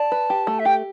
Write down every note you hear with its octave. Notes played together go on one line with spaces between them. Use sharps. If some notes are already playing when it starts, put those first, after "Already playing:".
Already playing: D5 A5
B4
G4
A3
E5
G4 G5